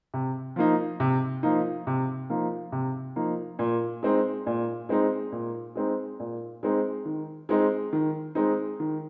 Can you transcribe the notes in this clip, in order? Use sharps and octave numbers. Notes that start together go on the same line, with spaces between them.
C3
F3 A#3 D#4
C3
F3 A#3 D#4
C3
F3 A#3 D#4
C3
F3 A#3 D#4
A#2
G#3 C4 D#4
A#2
G#3 C4 D#4
A#2
G#3 C4 D#4
A#2
G#3 C4 D#4
D#3
G#3 C4 D#4
D#3
G#3 C4 D#4
D#3